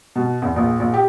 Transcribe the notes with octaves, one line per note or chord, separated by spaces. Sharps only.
B2
E2
A#1
A#1
G4